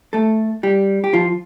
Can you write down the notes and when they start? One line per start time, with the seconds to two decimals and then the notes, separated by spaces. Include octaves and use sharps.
0.13 A3 A4
0.63 G3 G4
1.04 G4
1.14 F3 F4